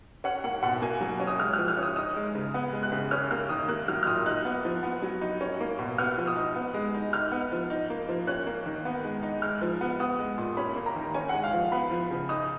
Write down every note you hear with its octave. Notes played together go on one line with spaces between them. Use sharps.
C#4 F#5
A#3 F#5
B2 F#5
A#3 G#5
F#3
C#4
D#6
G#3 F6
F6
F3
F6
C#4
D#6
D#4 D#6
G#3
C#3
B3
G#3
F#6
C#3
C#4 F6
A#3 F6
D#3 D#6
A#3 F#6
F#3 F6
F6
A#2 D#6
D#4 F#6
B3
F3
B3
F#3
D#4
C#4
A#3
B2
B3 F6
F3
D#6
D#4
B3
G#3
D#4
D#4 F6
B3
F3
D#4
A#3
F3
C#4 F#6
A#3
D#3
B3
G#3
D#4
G#3 F6
F3
B3
B3 D#6
G#3
A#2
C#4 B5
A#3
A#5
D#3
C#4 G#5
F#5
G#3
F5
F3
B3 B5
F3
C#3
D#4 D#6